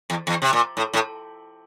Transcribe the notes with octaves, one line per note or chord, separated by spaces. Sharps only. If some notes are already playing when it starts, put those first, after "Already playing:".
E2
E2
C3
A#2
A2
A2